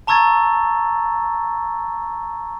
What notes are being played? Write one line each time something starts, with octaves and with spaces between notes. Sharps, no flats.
A5 A#5 C#6 E6 G#6 A6